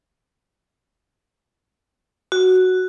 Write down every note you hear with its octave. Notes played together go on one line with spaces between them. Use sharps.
F#4